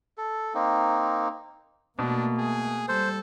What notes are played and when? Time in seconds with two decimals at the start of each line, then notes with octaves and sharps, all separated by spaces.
0.18 A4
0.54 A#3 C4 D#4
1.99 B2 A3 A#3 D4
2.39 G#4
2.88 G3 A4 C5